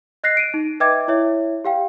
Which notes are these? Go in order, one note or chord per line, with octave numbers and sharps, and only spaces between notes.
D#5 F#6 A#6 C7
D7 D#7
D#4
B4 D#5 E5 G5 D6 G#6
E4 C#5 E5
G4 F5 G5